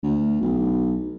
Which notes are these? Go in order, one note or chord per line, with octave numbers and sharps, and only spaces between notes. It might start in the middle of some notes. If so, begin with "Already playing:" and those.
D2
B1